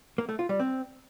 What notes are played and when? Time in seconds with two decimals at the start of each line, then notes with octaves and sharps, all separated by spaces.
0.18 A#3
0.29 A3
0.39 F4
0.49 G3
0.60 C4